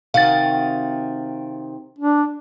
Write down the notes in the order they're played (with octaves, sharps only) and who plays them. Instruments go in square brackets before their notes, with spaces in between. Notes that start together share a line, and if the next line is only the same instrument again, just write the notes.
[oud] C3 D#3 F#4 [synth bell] F5 A6
[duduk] D4